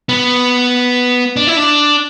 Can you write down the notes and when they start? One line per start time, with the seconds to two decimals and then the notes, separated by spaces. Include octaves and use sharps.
0.09 B3
1.36 D4
1.47 E4
1.57 D4